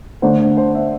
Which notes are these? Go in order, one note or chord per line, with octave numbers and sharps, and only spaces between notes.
D2 D3 A3 D4 C5
C5
E5